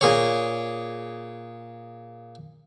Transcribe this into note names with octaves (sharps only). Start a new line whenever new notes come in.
A#2 G#4 C#5